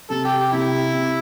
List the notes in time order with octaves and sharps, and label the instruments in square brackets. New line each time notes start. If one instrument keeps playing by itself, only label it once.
[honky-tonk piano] C3 [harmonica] A4
[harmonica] G4
G4
[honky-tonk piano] C3 [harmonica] E4
[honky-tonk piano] C3